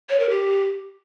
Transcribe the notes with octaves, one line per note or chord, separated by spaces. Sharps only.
C#5
A#4
G4